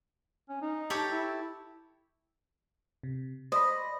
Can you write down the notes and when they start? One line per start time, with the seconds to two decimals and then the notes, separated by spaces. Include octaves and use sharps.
0.49 C#4
0.62 D#4
0.90 G4 A4 C#5
1.11 E4
3.03 C3
3.52 C5 D5 D#5 B5